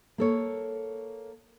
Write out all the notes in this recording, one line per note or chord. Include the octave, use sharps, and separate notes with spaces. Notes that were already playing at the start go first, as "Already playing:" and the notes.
A#3 A4 C#5